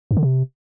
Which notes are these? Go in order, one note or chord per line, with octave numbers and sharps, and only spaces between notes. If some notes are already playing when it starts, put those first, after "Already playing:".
G2
D3
C3